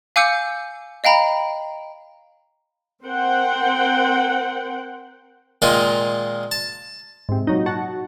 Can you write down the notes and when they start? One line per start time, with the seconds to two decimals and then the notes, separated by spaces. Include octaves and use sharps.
0.16 F5 G#5 D6 E6 G6 C#7
1.04 D#5 F5 G5 A#5 B5
3.03 C4 A#4 C5 F#5 G5
5.62 A#2 D#3 G#3 A#3 D#4 F4
6.51 A5
7.29 G#2 C3
7.47 A#2 F#3 D#4
7.66 F#4 F#5 A5 C#6